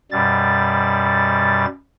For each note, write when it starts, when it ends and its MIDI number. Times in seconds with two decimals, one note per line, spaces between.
0.11 1.65 42
0.11 1.65 47
0.11 1.65 55
0.11 1.65 93